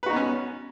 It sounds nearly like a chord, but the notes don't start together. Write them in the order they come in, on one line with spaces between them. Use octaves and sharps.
B4 F#4 D#4 B3 C#4